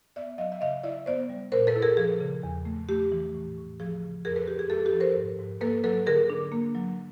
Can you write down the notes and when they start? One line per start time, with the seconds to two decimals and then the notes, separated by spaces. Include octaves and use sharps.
0.16 B3 D5 E5
0.38 F#3 D#5 F5
0.52 E5
0.61 C#3 D#5 F5
0.83 E4 D5 E5
1.06 B3 C5 D5
1.29 G3
1.52 A#2 A#4 C5
1.67 A4 B4
1.76 E4
1.82 G#4 A#4
1.97 F3 G#4
2.20 C#3
2.43 E2
2.65 A3
2.89 A3 G4
3.12 E3
3.35 A2
3.57 A2
3.80 F3 G#4
4.02 C#3
4.25 F2 G#4 A#4
4.36 A4 B4
4.47 F2 G4
4.59 G#4
4.70 G#3 G4 A4
4.86 G4 A4
4.93 F3
5.00 A#4 C5
5.16 G#2
5.39 G#2
5.61 A#3 A4 B4
5.84 F#3 A4 B4
6.07 D3 G#4 A#4
6.30 D4
6.52 A#3
6.75 F#3